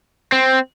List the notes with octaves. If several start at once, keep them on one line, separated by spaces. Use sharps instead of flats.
C4